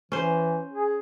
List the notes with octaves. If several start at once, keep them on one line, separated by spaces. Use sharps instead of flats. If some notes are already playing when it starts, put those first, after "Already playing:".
E3 C#4 C5
G#4